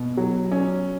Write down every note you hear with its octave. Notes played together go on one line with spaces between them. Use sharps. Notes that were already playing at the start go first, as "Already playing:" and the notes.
Already playing: B2
F#3
C#4